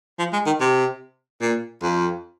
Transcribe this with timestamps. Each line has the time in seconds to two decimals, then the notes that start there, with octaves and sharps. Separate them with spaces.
0.19 F3
0.33 G#3
0.46 D#3
0.61 C3
1.41 A#2
1.82 F2